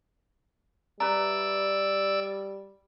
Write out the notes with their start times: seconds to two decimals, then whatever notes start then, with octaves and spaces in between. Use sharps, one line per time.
1.00 G3 B4 D5 E5 A#5 E6